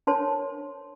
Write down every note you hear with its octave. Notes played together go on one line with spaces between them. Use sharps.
D4 A#4 C5 C#5 A5 C6